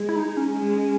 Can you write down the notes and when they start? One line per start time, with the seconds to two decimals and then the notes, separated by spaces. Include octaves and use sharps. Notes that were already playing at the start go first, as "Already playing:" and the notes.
Already playing: G#3
0.09 E4
0.16 D#4
0.37 C#4
0.59 G#3